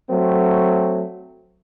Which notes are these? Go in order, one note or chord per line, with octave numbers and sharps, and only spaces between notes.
F#3 A3 C4